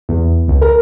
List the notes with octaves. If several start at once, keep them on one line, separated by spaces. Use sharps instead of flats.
E2
C#2
A#4